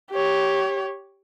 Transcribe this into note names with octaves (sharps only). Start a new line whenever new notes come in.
G4 C#5